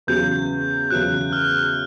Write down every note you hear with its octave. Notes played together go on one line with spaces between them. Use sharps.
E2 C#3 F#3 G6
E2 C#3 F#3 F#6
F6